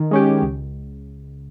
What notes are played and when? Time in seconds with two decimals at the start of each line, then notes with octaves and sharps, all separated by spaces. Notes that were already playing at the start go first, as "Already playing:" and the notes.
Already playing: D#3
0.11 G#3 C#4 G4
0.42 C#2